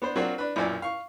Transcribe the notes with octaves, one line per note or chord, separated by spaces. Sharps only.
B3 D4 C5
F#3 A#3 C4 D4 F4 F#4
D4 B4
B1 F#2 A#2 E4 D5 G#5
F5 C#6